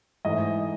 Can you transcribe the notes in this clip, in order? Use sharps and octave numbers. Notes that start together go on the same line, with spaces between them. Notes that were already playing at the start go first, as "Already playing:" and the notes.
G#2 E3 A3 D#5